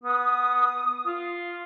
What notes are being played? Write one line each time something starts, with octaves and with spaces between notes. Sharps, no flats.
B3 D#6
F4